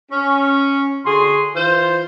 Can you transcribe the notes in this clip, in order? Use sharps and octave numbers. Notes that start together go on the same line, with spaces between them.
C#4
D3 F#4 G#4 C6
E3 F4 C5